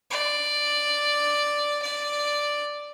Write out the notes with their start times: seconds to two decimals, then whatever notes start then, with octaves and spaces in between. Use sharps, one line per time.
0.10 D5
1.82 D5